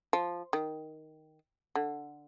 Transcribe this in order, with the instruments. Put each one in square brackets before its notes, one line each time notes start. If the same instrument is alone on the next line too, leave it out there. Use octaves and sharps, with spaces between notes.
[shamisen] F3
D#3
D3